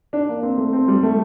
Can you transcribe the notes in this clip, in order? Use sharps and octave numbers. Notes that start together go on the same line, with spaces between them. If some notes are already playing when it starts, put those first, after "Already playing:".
D4
A#3
C4
A3
C4
G3
A3